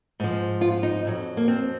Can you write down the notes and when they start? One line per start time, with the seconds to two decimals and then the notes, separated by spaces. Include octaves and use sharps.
0.20 G#2 F3
0.61 F4
0.83 D#4
1.05 F2 D#3 F#3
1.37 A#3
1.48 C4